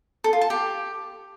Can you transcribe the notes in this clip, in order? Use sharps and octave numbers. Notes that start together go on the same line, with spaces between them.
A4
F4
A5
G4